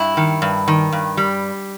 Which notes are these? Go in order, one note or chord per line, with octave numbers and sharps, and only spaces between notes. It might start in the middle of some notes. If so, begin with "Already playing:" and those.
Already playing: G2 E4
D#3
G2
D#3
G2
G3